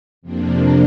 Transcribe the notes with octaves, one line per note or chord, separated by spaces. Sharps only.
F2 C3 F3 A#3 D4